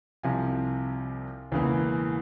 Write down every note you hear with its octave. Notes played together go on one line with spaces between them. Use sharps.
C2 C3 F3 F5 G#5
E1 E2 C#3 E3 A#3